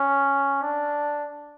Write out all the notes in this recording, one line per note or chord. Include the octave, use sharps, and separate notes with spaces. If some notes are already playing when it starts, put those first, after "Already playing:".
Already playing: C#4
D4